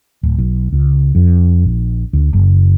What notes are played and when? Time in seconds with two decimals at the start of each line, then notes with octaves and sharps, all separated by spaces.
0.23 D1
0.38 B1
0.72 C#2
1.15 F2
1.65 A#1
2.13 D2
2.33 F#1